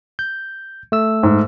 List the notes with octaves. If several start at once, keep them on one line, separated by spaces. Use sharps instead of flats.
G6
A3 E6
G#2